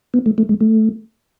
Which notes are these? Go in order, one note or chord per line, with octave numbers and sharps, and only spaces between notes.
B3
A3
A3
G#3
A3